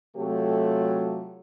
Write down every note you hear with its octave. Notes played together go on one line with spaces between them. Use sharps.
C3 F#3 A3 F4 G4 A4